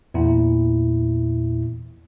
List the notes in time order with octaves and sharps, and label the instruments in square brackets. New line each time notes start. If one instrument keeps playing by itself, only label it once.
[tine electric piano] E2 A#2 E4